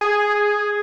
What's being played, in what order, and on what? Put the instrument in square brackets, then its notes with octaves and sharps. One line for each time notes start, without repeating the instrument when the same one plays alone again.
[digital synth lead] G#4